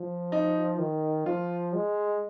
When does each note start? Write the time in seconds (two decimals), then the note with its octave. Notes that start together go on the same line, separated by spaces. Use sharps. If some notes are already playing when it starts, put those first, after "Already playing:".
Already playing: F3
0.32 D#4
0.79 D#3
1.26 F3 F4
1.74 G#3